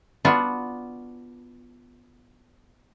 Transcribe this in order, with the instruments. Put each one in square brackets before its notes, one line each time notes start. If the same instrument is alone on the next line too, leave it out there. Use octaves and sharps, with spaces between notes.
[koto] B3 D4 F4 F#4